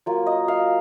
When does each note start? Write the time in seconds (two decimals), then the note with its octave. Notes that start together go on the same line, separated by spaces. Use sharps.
0.06 F#3 A#3 F4
0.26 D#5
0.48 F5